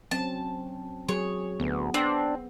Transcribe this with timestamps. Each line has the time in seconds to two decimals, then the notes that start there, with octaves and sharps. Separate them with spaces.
0.11 F#3 C4 C#4 A5
1.09 F#3 G#4 C#5
1.60 D2 B3
1.94 C4 D4